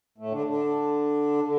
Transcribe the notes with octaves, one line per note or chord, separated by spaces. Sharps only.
A2 A3
D3 D4
D3 D4
D3